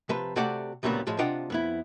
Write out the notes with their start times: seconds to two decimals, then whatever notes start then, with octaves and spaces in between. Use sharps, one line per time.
0.09 C3 F3 B4
0.36 C3 A3 F#4 G4 D5 F#5
0.83 D2 A#2 C#3 F#3 G3 B3
1.07 A2 F3 G#3
1.19 C3 D4 F4 D#5 F#5 G5
1.50 F2 B3 E4